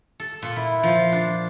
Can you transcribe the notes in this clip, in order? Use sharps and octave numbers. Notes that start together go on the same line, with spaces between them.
A4
A#2
E4
F3
D4